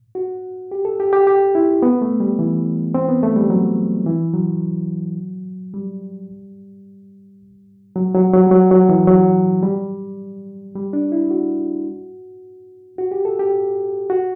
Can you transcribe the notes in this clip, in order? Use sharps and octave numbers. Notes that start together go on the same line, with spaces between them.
F#4
G4
A4
G4
G4
G4
E4
B3
A3
G3
E3
C4
B3
A3
G3
F#3
E3
F#3
G3
F#3
F#3
F#3
G3
F#3
F#3
E3
F#3
G3
G3
D4
E4
F#4
F#4
G4
A4
G4
F#4